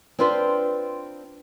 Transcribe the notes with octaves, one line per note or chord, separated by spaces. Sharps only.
C4 D4 F4 B4 C5